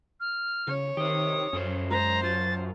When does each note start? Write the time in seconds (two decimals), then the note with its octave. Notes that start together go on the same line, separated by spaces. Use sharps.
0.20 F6
0.68 C#3 C#5
0.97 D#3 G4 C5 D#6
1.53 F#2 C#4 A4 C5
1.90 G#3 C5 A#5
2.23 F#3 F4 A6